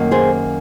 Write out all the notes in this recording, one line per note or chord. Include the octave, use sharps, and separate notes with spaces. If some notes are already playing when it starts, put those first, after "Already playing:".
Already playing: F#2 D#3 A#3
G#4 C5